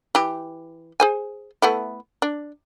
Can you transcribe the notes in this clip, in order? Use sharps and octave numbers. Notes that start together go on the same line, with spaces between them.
E3 G4
G#4 C5 G#5
A3 B3 E4
D4